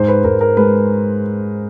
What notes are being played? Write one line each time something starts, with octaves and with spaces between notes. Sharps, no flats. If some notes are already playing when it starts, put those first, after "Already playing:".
Already playing: G#2 C5
B4
G#2 A#4
A#4
G#3 B4